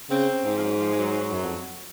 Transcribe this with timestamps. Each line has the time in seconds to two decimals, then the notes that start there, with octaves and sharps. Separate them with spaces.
0.10 C#3 C4
0.45 G#2
0.58 F3
0.63 F#3
0.80 F3
0.93 G#3
0.98 F#3
1.33 F#2
1.44 F2